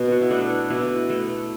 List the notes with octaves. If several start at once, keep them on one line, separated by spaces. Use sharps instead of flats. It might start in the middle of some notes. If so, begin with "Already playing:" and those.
Already playing: B2
F#4
E4
A3 D4
B2 E4
A3